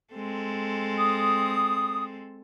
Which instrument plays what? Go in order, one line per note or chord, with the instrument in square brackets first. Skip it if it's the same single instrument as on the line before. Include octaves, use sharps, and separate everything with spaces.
[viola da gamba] G#3 C4 A4
[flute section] D#6